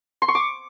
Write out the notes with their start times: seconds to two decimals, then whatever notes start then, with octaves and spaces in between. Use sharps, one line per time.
0.22 C6
0.28 C#6
0.35 D6